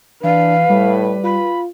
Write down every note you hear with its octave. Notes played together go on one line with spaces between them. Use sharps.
E3 D4 B4 F5
A2 G3
F4 B5